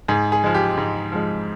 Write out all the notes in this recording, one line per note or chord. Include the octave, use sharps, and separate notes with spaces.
G#2 G#4
G#4
F3 G#3
G4
G#2
F3 G#3